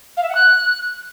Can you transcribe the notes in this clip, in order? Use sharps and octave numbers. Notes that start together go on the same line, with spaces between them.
F5
E5
F#5
F#6